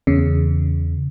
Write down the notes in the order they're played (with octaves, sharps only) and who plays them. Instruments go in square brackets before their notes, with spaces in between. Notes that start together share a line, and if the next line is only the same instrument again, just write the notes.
[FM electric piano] E2 C#3